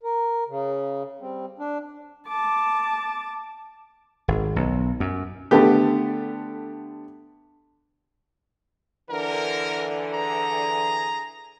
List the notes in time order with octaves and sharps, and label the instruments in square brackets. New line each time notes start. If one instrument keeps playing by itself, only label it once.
[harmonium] A#4
C#3
G3 C4
D4
[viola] A5 D6
[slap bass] G#1
B1
F#2
[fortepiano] D3 A3 B3 G4
[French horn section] D3 E3 [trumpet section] A#4
[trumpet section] G#4 A#5